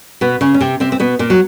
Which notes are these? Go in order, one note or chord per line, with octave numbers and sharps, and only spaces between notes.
B2 B3
C#3 C#4
C#4
C3 C4
C3 C4
C4
B2 B3
A#2 A#3
F#3